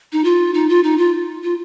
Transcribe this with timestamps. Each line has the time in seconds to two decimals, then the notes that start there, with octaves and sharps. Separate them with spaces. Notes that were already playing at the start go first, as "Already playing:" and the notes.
0.12 D#4
0.24 F4
0.54 D#4
0.69 F4
0.83 D#4
0.98 F4
1.43 F4